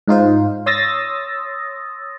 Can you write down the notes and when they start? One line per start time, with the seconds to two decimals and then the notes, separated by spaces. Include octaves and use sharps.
0.08 G#2 D#4 F4 C5
0.66 C#5 C6 D#6 E6 A6 A#6